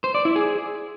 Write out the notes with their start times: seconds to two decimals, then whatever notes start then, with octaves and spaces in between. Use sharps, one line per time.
0.04 C5
0.15 D5
0.25 E4
0.36 G#4